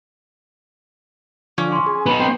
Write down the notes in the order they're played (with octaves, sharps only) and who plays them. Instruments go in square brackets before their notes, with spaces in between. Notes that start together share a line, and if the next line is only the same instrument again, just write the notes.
[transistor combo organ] D3 F3 [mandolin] C#4 D6
[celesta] C6 C#6
[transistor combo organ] G#4
[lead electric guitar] B3 D#4 [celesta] B5
[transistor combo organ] C4 G5 C6